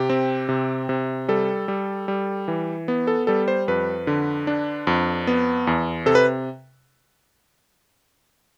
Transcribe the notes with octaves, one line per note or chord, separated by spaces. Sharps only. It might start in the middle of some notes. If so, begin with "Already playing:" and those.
Already playing: C3 G4
C4
C3
C3
G3 A4
G3
G3
E3
B3
A4
G3 A4
C5
F2 B4
D3
D4
F2
B3
E2
C3 A4
B4